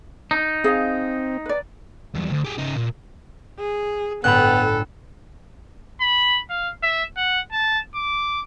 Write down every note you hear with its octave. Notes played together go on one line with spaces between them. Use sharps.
D#4
C4 G#4 D#5 F5
B4 D5
E2 G2
D2
G4 G#4
C#3 D#4
A#2
G#4
G1 A2 B3 A4 G5 B5 F#6
B5
F5
E5
F#5
A5
D6